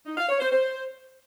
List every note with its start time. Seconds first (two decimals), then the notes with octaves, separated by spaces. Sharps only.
0.06 D#4
0.18 F5
0.29 C#5
0.40 C5
0.52 C5